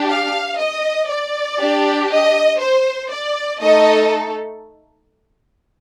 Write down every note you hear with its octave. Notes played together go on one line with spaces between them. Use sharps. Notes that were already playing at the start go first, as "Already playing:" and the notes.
Already playing: D4 G4
F5
D#5
D5
D4 G4
D#5
C5
D5
A3 D#4 A4 D#5